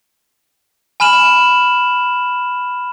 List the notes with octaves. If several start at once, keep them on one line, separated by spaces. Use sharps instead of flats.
G#5 B5 F6 E7 F#7